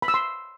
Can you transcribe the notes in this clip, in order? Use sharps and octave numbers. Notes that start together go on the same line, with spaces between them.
B5
E6
C6